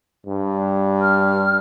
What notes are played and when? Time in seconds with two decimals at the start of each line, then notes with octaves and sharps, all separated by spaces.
0.26 G2
1.02 F6